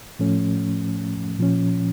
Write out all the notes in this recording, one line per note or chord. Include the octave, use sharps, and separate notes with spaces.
A2 F3 A3 C#4
A#2 F3 C#4